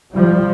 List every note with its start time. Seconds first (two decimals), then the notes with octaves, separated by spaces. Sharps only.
0.13 F3 G3